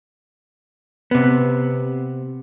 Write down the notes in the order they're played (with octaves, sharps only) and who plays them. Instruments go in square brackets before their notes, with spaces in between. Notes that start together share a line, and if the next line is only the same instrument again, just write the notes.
[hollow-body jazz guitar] C3 B3